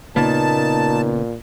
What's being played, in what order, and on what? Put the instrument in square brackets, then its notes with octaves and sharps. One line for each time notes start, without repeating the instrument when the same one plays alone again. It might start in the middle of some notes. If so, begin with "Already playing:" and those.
[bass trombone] A#2 [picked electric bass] C#3 A#3 B3 [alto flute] D#4 [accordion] A5